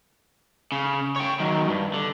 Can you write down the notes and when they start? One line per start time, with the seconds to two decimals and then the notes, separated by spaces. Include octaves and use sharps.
0.72 C#3
1.16 C#5 G5
1.40 D#3 F#3
1.69 G2
1.94 D3